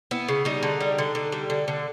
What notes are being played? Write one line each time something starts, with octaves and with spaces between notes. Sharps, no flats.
B3 E4
C#3
G3 D#4
D3
G3
D3
D3
G3
D3
D3